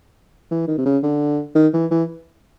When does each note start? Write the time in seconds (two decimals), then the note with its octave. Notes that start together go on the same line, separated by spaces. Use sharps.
0.51 E3
0.68 D#3
0.78 C3
0.86 C#3
1.03 D3
1.55 D#3
1.74 E3
1.91 E3